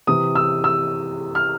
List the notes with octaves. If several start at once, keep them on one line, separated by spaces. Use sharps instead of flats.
C3 E3 D#6
E6
E6
F6